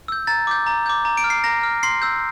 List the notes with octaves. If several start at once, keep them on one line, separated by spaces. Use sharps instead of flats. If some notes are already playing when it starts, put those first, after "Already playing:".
E6 G6
A#5 A6
D6 G6
A#5
D6 G6
A#5
D7
F6
C7
A#5 A#6
F6
C6 C7
E6 G6